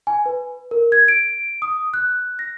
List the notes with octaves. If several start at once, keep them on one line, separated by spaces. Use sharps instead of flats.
G#5
B4
A#4
G#6
D7
D#6
F#6
A#6